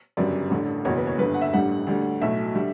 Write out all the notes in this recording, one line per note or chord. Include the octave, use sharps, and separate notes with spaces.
G1 F#2 C#3 G3 D5
A1 G2 D3
F#1 E2 B2 C#5
B4
C#5
G1 G2 D3 B4
F#5
E5
A1 G2 D3 G3 F#5
D2 D3 G3
B1 A2 F#3 E5
D3 G3